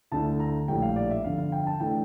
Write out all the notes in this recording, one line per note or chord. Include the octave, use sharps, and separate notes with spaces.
D2 D3 A3 E4 A5
A#5
A#1 A2 G3 G5
F5
D5
E5
G1 F2 D3 F5
F5
G5
A5
A2 E3 A3 D4 G5